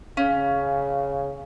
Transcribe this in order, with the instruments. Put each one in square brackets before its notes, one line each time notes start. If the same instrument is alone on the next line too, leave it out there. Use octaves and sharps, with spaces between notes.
[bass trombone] C#3 [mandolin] C#4 [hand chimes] F5